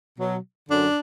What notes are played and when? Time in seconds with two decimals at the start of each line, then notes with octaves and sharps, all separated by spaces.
0.19 B2 F#3
0.69 F#2 D3 F#3 D4